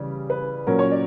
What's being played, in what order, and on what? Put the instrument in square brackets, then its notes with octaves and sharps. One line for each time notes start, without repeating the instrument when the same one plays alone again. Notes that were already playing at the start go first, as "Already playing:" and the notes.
Already playing: [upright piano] C#3 E3 G3
B4
A#2 F#3 C#4 A#4
C#5
D5